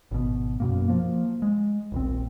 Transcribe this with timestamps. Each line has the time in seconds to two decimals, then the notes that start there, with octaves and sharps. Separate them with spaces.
0.11 G#1 B2
0.60 F#2 B2 A#3
0.88 F3 A#3
1.42 G#3
1.92 D#1 A#1 C4